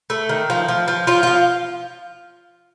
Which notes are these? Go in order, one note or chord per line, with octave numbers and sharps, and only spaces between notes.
A3
D#3
F3
F3
F3
F3 F4
F3 F4